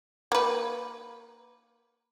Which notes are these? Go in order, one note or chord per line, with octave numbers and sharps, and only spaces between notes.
A#3 B4